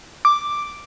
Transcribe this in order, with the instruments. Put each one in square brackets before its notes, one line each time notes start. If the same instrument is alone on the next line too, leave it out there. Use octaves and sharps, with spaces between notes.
[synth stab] D6